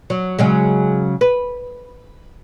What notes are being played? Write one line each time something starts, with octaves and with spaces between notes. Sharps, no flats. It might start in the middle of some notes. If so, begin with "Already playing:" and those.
F#3
C#3 F#3 G#3
B4